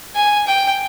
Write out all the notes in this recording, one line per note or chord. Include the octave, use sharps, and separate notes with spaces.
G#5
G5